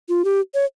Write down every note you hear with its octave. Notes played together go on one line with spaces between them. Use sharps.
F4
G4
C#5